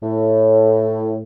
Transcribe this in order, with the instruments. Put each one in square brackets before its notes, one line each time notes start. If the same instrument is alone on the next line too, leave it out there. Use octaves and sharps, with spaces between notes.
[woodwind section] A2